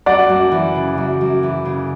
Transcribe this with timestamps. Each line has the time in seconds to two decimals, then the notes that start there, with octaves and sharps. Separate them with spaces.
0.06 F#2 D5 F#5
0.29 F#2
0.52 E3
0.75 C#3
0.98 F#2
1.21 F#2
1.43 E3
1.65 C#3